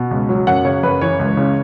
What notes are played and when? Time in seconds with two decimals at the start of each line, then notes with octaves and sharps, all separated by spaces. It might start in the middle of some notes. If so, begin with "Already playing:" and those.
Already playing: B2
0.11 C#2
0.29 F#3
0.47 F#2 F#5
0.65 C#3 C#5
0.83 F#2 B4
1.01 E3 C#5
1.20 C#2
1.37 C#3